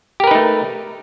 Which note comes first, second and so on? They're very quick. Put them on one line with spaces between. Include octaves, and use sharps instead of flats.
G4 A#4 B4 D#4 A3